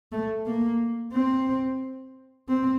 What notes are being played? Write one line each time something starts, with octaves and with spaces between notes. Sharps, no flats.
A3
A#3
C4
C4